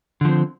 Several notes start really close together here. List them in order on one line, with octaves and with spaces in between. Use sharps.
D3 F3 C4